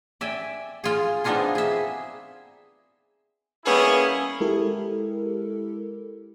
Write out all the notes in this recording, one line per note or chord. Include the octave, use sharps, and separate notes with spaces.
D5 E5 G5 G#5
F4 G#4
B3 C4 D4 D#4 F4 G#4
G#4 E5
G3 A#3 B3 C#4 E4 G#4
G#3 E4 G4 A4 A#4